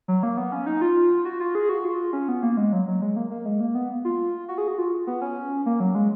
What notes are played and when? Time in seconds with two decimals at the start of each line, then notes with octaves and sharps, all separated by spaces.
0.08 F#3
0.23 A#3
0.37 B3
0.52 C#4
0.66 D#4
0.82 F4
1.25 F#4
1.40 F4
1.55 G#4
1.69 F#4
1.85 F4
2.13 C#4
2.29 B3
2.43 A#3
2.57 G#3
2.73 F#3
2.88 F#3
3.02 G#3
3.16 A#3
3.31 A#3
3.45 G#3
3.61 A#3
3.75 B3
4.05 F4
4.48 F#4
4.58 G#4
4.68 F#4
4.78 F4
5.07 B3
5.22 C#4
5.66 A#3
5.80 F#3
5.95 G#3